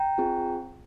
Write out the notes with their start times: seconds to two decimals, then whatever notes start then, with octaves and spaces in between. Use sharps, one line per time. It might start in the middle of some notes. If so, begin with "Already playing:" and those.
Already playing: G5 A#5
0.18 C4 F4 G#4